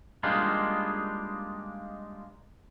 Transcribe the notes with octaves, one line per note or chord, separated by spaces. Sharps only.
G3 G#3 A#3 D4 D#4 F4